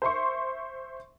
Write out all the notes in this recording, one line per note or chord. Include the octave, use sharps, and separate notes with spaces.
C5 E5 C6 C#6